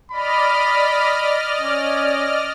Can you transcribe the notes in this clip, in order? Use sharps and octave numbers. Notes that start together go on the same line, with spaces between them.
D5 D#5 B5 F6
C#4